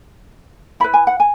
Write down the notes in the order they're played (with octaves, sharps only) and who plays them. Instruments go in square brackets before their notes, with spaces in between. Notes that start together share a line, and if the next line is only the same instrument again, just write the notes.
[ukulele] E4 B4 B5
G#5
F#5
G#5